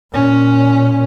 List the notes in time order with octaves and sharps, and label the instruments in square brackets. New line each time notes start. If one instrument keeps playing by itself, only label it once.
[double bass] A#2 C#4